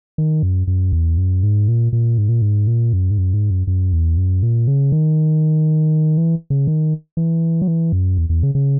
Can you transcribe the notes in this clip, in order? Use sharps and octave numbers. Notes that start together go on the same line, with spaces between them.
D#3
F#2
F#2
E2
F#2
G#2
A#2
A#2
G#2
A#2
G#2
A#2
F#2
G#2
F#2
G#2
F#2
F#2
E2
F#2
A#2
C#3
D#3
E3
C#3
D#3
E3
F#3
E3
F#2
E2
E2
C#3
C#3